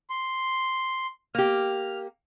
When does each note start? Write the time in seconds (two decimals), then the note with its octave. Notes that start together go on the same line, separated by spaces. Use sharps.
0.10 C6
1.35 A#3 G4 F6